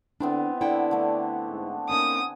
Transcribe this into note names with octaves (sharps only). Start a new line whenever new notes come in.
D3 B3 C4 D4 E4
D3 E4 D5 F#5 G5
D3 A3
G#2
A#3 C4 C#4 D#4 G#5 D#6